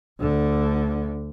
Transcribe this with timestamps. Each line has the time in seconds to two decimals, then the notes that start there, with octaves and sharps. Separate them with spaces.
0.19 D2 D3